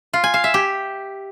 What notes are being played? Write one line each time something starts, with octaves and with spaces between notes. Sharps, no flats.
F4
G#5
F5
E5
G4